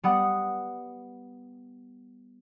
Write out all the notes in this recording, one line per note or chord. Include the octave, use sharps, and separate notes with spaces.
G3 B3 F#5 D#6